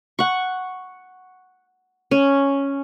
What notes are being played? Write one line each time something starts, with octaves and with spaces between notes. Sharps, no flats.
F#5 C#6
C#4